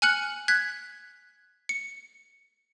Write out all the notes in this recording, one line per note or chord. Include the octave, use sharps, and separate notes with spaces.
G#5 F6 F#6 C#7 F#7
F#6 G#6 B6
C#7